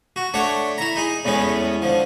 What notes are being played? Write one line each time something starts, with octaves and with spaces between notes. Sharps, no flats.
F#4
A3 D4 C#5 D5 F#5
E4 A#5
D#4 G#4
E2 A2 G#3 B3 C#4
D3 F3